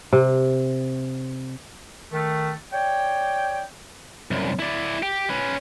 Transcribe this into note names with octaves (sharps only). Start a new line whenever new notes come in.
C3
D#3 A3
C#5 D5 G5
C2 F#2
E4 D5
G4
C#4 B4